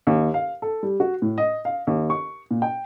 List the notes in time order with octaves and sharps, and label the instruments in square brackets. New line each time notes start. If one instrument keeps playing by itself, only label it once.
[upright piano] D#2
F5
A4
G3
F#4
A2
D#5
F5
D#2
C#6
A#2
G5